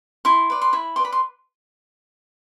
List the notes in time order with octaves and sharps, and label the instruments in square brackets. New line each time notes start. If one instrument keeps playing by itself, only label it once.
[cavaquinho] E4 C6
B4 D5
C6
E4 B5
B4 D5 C6
B5
C6